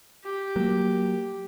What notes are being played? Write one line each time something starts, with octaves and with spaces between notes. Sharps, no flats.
G4
F#3 A#3